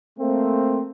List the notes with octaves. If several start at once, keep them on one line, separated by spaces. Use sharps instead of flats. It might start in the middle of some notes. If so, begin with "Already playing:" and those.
A3 A#3 C4